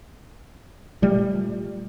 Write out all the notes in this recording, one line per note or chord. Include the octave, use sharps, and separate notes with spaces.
A#2 G3 A3